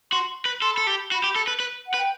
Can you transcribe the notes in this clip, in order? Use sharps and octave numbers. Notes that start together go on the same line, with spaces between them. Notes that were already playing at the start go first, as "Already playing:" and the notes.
F#4 C6
B4
A4 C6
B5
A4
G4 A5
B5
F#4 B5
G4
A4
B4
B4
F#5
B4
G5